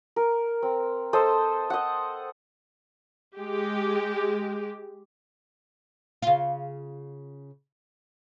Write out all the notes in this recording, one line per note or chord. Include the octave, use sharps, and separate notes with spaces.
A#4
C4
A4 C5 D#5
D#5 F#5
G#3 G4
C#3 F4